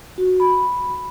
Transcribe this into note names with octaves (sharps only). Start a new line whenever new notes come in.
F#4
B5